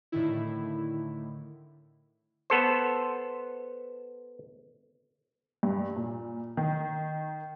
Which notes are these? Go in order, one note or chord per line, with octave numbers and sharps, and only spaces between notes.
A2 D3 D#3 E4
B3 A4 C5
G2
A#2
D#3